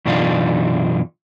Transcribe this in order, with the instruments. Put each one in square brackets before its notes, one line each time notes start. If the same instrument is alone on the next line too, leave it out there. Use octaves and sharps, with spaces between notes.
[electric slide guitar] F#2 B2 E3 D4 D#4 F4